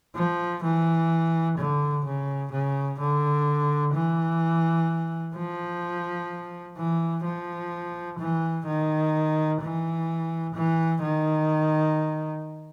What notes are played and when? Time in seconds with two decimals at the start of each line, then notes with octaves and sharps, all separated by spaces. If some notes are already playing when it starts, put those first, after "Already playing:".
0.16 F3
0.63 E3
1.58 D3
2.05 C#3
2.51 C#3
2.99 D3
3.94 E3
5.35 F3
6.78 E3
7.24 F3
8.19 E3
8.66 D#3
9.61 E3
10.55 E3
11.02 D#3